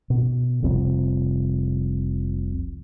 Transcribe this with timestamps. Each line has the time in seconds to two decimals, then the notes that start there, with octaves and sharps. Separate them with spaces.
0.10 B2
0.63 F1 C2 F3 C4